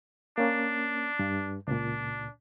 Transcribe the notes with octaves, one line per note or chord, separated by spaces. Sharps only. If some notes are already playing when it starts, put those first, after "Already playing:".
A#3 C#4 D4
G2
C#2 A#2 D4